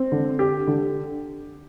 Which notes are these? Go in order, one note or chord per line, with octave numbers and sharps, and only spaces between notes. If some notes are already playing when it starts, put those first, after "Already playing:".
Already playing: C4
D3
G4
D3